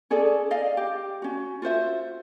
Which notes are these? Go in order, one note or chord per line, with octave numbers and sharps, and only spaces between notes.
C#4 G#4 A4 D5
D5 D#5 F5
G4
C#4 F#4
F4 F#4 C5 E5